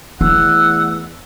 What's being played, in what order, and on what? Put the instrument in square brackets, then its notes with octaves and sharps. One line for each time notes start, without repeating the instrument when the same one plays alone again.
[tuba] E2 [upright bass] A3 [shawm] F#5 [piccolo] E6